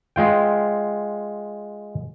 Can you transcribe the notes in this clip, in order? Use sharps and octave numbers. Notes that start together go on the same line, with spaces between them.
G#3 F4 G5